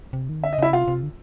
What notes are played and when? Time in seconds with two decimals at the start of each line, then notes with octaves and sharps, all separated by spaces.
0.13 C3
0.29 D#3
0.43 D3 E5
0.53 D#5
0.58 C#3 E4 E5
0.73 C3 F4 F5
0.88 C3
1.03 D3